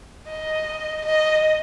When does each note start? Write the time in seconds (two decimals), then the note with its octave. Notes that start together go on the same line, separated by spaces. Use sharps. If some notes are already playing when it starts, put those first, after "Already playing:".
0.28 D#5
1.06 D#5